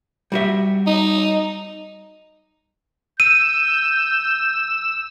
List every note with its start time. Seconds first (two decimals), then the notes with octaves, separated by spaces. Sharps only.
0.32 G3 F#4 E5
0.87 D#4
3.20 E6 G6 D#7